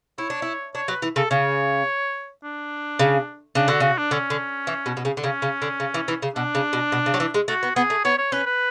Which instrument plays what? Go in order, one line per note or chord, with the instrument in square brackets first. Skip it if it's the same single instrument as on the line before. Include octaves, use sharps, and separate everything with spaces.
[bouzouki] E4 [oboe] C#5
[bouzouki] D4
E4
[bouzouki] D4 [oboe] C#5
[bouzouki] F#3 [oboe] B4
[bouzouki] E3
[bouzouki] C#3 [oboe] A4
[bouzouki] C#3 [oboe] C#5
[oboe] D4
[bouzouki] C#3
[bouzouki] C#3 [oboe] D4
[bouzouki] D3 [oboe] F#4
[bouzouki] C#3 [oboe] F#4
[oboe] D4
[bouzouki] D3 [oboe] C#4
[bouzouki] D3
E3
B2
B2
C#3
D3
[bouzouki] C#3 [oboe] C#4
[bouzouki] C#3
D3
C#3
E3
E3
C#3
[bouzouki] B2 [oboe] D4
[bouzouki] C#3
B2
B2
C#3
F#3
E3
G#3
[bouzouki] A3 [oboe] F#4
[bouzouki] B3
[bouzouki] B3 [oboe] G#4
[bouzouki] A3
[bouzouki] B3 [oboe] C#5
[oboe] C#5
[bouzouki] C#4 [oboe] B4
[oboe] B4